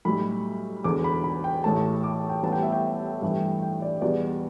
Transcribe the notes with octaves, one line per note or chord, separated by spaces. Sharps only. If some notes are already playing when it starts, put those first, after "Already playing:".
B1 A2 G3 B5
E1 E2 D3 D6
B5
B5
G5
A1 A2 A3 A5
D6
G5
A1 A2 G3 B3 A5
G5
E5
G5
G2 E3 A3
G5
D5
E2 B2 G3 B3 D5